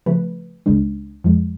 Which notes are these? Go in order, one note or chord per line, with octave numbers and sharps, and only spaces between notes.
C#3 F3 A3 B4
C#2 C#3 G#3 D4
F2 F3 G#3